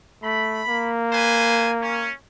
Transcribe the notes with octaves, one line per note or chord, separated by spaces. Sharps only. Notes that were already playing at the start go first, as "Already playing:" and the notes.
A3 B5
A#3
B4 C5 G#5
C#4